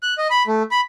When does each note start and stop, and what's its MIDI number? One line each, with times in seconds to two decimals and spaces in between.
0.03 0.14 90
0.18 0.27 75
0.30 0.43 83
0.47 0.63 57
0.71 0.81 83